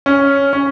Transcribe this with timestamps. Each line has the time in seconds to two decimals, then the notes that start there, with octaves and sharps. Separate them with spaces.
0.06 C#4
0.53 C#4